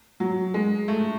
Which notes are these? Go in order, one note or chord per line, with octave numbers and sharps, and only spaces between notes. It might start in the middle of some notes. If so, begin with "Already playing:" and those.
F#3
G#3
A3